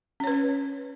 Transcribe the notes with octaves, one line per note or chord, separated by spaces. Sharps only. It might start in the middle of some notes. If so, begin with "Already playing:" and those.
C#4 B4 C#5